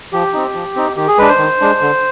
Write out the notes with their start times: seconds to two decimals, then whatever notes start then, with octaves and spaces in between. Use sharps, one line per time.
0.13 F3 G4
0.34 C4 D#4
0.54 F3
0.76 C4 D#4
0.96 D#3 G4
1.07 G#4
1.18 G#3 D4 B4
1.28 C5
1.39 D#3
1.61 G#3 D4
1.81 D3